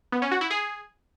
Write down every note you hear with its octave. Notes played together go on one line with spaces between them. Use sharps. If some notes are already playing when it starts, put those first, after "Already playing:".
B3
C#4
F#4
E4
G#4